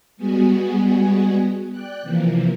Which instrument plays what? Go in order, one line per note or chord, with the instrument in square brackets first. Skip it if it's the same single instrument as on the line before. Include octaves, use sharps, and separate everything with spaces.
[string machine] G3 G#3 B3 F#4 G#4
D5 G5 F#6
C3 E3 F3 A#3